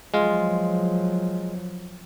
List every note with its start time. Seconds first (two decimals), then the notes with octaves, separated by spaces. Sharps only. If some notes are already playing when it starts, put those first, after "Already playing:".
0.14 F3 F#3 G#3 F4